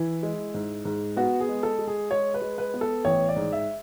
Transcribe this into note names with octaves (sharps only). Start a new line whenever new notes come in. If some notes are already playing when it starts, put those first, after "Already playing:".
Already playing: E3 E4
G#3
G#2
G#2
B3 F#4
G#4
G#3
A4
G#3
G#4
G#3 C#5
B4
G#3
B4
B3
A4
A1 C#5
D5
G#2
E5